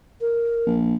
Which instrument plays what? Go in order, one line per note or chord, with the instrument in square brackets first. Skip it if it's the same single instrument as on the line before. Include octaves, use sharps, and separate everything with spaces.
[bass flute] A#4
[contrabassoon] A#1